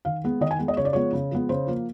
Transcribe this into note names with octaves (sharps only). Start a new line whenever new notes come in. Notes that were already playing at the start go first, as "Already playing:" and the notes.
D#3 F5
G#3 B3
D#3 D#5
G#5
G#3 B3
D#5
C#3 C#5
D5
F3 G#3 B3 C#5
C#3
F3 G#3 B3
C#3 C5
F3 A#3